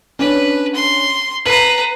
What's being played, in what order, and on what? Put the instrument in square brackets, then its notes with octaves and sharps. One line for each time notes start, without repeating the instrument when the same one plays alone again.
[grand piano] C#4 D4 [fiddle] B4
[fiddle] C6
[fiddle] B4 A#5 [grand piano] C7 F#7